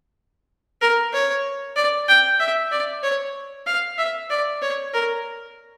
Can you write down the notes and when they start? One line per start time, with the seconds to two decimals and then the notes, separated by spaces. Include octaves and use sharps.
0.81 A#4
1.13 C#5
1.76 D5
2.08 G5
2.40 E5
2.72 D5
3.03 C#5
3.66 F5
3.98 E5
4.30 D5
4.62 C#5
4.93 A#4